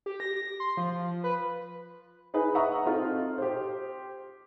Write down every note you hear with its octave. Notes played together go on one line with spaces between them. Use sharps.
G4
A#6
C6
F3
B4
D#4 G#4 B4
E5 F#5 A#5 C#6 D#6
C4 D#4 F4 A4
G4 C5